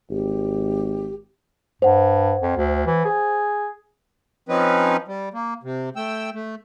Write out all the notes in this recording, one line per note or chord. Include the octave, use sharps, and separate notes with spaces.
G#1 G4
G2 C5 F#5
F2
D2
E3
G#4
F3 C4 C#4 D#4 B4
G3
A#3
C3
A3 G5 E6
A3